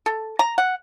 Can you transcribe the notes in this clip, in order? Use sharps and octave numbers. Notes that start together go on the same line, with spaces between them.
A4
A#5
F#5